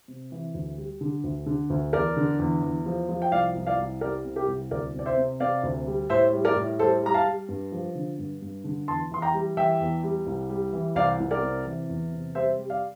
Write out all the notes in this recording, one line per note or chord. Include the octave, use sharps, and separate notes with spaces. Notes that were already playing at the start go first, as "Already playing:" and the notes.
C3
E3
D2
G3
D3
D2
D3
D2
E2 A#4 D5
D3
E2
E2
F3
F3
G5
C2 D5 F5
C2
D5 F5
C2
G3 A#4 D5
C3
G4 A#4
C2
D2 A#4 D5
C3 D5
C5 E5
C3
C3 D5 F5
D2
G3
A2 C5 E5
G3
A#4 D5
A2
G3 A4 C5
G3 A#5
F5 A5
G3
G2
F3
D3
G2
G2
D3
E2 A5 C6
E3 C6
G5 A#5
G3
E3 E5 G5
E2
G3
C2
G3
E3
C2 D5 F5
C2
A#4 D5
C3
E3
E2
C3
G3 C5 E5
G3
D5 F5